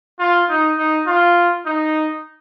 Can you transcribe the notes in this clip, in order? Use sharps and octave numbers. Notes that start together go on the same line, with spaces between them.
F4
D#4
D#4
F4
D#4